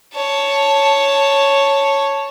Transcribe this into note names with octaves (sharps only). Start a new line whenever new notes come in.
C#5 A5